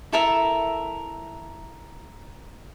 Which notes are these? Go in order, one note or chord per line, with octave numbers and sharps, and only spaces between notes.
E4 A4 A#4 E5